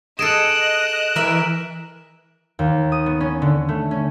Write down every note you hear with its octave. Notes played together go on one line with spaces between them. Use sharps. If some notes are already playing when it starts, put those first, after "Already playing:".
G#4 A4 D#5 F#6 D7 E7
E3 A#4 E5
D#2
D#6
B3
C#4
D3
A3
C#4